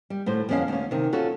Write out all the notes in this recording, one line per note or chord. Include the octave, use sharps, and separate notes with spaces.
G3
D2 A2 C5
F2 B2 D3 C#4 E4 F5
D2 C#4
C3 D#3
C#4 F4 F#4 A4